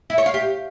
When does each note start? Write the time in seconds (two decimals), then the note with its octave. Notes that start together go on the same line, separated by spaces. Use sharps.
0.10 E4
0.18 C#5
0.26 F5
0.34 G4